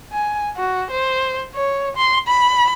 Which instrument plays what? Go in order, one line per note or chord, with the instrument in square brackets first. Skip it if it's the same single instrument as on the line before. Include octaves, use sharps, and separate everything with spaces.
[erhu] G#5
F#4
C5
C#5
C6
B5